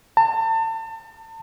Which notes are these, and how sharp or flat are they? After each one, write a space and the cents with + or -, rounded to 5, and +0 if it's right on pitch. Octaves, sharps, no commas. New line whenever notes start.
A5 +35